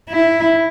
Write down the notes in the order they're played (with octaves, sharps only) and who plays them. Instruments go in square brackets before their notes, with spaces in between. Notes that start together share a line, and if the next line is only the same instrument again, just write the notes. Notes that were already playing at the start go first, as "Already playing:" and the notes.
[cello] E4